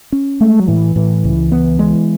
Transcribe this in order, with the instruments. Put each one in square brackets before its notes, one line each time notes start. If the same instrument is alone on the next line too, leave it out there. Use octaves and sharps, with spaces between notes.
[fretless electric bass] C#4
[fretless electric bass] G#3 [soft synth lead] A3
[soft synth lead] F#3
[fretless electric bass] A2 [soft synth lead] E3
[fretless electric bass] A2 [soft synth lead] E3
[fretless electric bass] C#2
B3
G#3